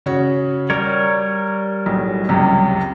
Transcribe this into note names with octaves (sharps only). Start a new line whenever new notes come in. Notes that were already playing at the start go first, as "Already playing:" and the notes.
C#3 F#4 C#5
G3 A#4 C#5 D5
B1 A2
C#2 F#2 C3